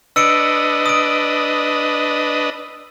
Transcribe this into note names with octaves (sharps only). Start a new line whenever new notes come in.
D4 B4 D#5 E6 C#7 D7
D#6 D7